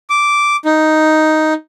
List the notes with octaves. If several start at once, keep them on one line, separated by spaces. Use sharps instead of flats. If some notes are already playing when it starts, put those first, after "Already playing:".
D6
D#4